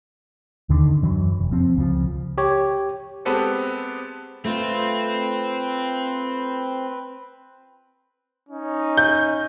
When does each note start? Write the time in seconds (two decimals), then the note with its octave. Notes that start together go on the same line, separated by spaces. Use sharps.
0.69 D#2 D3 D#3 D4
1.03 F#2 E3 F#3
1.39 F1
1.52 F3 C4
1.76 C#2 C#3 F3
2.38 G4 C#5
3.25 G#3 B3 C4 G4 A4
4.44 A3 C4 F4 B4
8.50 C#4 D#4
8.97 G6